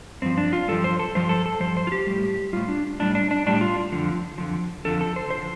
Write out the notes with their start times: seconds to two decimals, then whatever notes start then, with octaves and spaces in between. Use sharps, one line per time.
0.22 G2 F3 C4
0.38 D4
0.53 F4
0.68 G2 F3 A4
0.84 C5
0.99 A4
1.15 G2 F3 C5
1.29 A4
1.46 A4
1.60 G2 F3 C5
1.77 C5
1.87 F4
1.92 G4
2.07 A2 G3
2.53 A2 G3 F4
2.68 D4
3.00 A2 G3 D4
3.15 D4
3.31 D4
3.46 A2 G3 D4
3.61 F4
3.92 F2 D3 F3
4.38 F2 D3 F3
4.85 F2 D3 F3 A4
5.01 A4
5.16 C5
5.30 D3 F3 C5